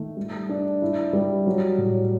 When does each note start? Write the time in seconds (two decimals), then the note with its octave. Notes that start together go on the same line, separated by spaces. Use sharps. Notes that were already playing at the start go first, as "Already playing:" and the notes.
Already playing: D#3 A3
0.17 G3
0.49 D4
0.82 E4
1.13 G3
1.47 F#3
1.78 A2